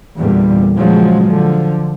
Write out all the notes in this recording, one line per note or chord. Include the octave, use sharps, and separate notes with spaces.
E2 A#2 D3 G3
A#2 C#3 F3 F#3 G#3
D3 F3